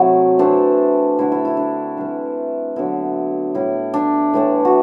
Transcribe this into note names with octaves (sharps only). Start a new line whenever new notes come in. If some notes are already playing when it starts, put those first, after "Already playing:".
Already playing: C3 F#3 A3 E4
E3 A3 C4 D4
D3 A3 D4 E4
E4
E4
D4
E3 G3 D4
D3 F#3 B3 E4
A2 G3 D4 E4
D4
A2 E3 A3
F#4